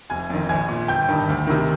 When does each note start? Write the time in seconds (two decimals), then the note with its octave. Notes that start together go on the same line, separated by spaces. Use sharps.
0.10 F1 G#5 G#6
0.30 F2 D#3
0.49 A#1 G#5 G#6
0.69 A#2
0.88 G1 G5 G6
1.08 G2 D#3
1.28 D2
1.47 C3 D#3